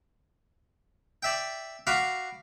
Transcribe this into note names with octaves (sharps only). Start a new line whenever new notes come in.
D5 E5 G5
F#4 F5 F#5 B5 D6